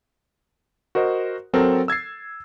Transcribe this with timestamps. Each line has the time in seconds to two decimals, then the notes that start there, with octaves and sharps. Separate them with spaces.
0.95 F#4 A#4 C5 D#5
1.53 F#3 C4 A4 A#4
1.88 E6 G#6 A6 C7